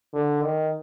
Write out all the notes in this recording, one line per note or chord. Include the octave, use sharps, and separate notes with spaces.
D3
D#3